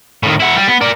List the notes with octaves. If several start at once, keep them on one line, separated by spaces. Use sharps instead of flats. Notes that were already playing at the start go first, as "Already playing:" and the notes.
A2 D#3
E4 F#4
G3
B3
A#4 D5